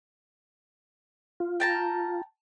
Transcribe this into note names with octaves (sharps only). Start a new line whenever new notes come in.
F4
G5 A5 A#5